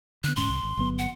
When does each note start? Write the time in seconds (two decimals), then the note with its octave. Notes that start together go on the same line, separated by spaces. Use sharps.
0.24 D3 B3 F#6
0.36 D#1 G#2 C#4 C6
0.49 C2
0.63 G#1
0.77 G1 F#3 B3
0.98 F#5